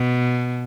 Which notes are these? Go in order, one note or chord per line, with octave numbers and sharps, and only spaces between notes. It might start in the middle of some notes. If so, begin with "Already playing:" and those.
Already playing: B2